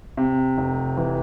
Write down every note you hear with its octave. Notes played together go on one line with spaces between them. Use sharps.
C3
F1
E3